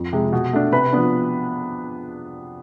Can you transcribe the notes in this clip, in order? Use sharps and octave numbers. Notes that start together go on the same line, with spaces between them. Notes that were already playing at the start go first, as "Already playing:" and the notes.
Already playing: F2
C3 F3 G#3
B2
A3 D4
C3 B4 B5
F3 B3 D4